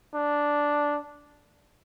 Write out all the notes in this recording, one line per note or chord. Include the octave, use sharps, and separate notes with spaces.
D4